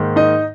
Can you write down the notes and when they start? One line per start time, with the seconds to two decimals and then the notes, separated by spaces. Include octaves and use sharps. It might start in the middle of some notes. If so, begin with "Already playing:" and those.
Already playing: G#2 D#3 A#3
0.16 D#4 D#5